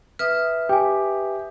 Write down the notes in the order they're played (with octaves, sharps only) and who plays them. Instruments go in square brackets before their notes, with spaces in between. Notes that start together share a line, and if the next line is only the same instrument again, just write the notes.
[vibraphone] B4 E5 D#6 [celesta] F6
[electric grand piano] G4 [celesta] G5 G#5